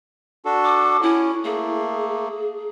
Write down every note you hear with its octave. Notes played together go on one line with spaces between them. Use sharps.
D4 F#4 A4
D6
C#4 E4
A3 A#3 G#4